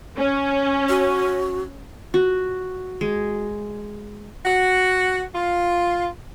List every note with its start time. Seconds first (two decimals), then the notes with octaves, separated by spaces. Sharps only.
0.17 C#4
0.89 F#4
2.14 F#4
3.01 G#3
4.46 F#4
5.34 F4